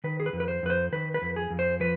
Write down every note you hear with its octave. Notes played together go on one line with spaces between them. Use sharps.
D#3 B4
G#4
B4
F2
B4
C5
F2 B4
C5
D#3 B4
B4
F2
G#4
F2
C5
F3 B4